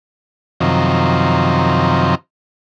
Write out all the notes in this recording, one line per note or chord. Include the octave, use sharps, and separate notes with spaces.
F#2 C3 D#3 F3